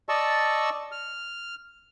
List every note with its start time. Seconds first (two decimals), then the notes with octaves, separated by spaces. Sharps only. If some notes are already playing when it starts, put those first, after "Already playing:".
0.09 D5 D#5 A5 C#6 E6
0.92 F6